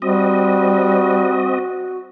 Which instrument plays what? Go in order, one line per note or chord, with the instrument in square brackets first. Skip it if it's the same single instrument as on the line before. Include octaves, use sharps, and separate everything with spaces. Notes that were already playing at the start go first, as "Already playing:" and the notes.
[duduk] G3 [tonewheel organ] C4 D#5 [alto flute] F#4